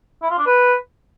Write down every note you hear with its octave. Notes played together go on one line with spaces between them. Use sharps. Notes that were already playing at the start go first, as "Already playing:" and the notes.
E4
F4
D4
B4